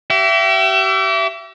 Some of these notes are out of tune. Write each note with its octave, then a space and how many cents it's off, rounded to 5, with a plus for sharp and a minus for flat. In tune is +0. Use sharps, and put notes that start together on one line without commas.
G4 -40 E5 +25